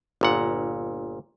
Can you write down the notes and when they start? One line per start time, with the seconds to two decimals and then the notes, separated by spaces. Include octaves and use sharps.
0.21 G1 A#2 F#5